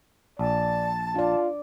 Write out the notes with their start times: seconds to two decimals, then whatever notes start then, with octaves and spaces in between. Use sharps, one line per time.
0.39 A#1 D5 A5
1.15 D4 F4 D5